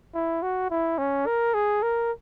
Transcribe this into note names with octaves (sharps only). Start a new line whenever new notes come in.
E4
F#4
E4
C#4
A#4
G#4
A#4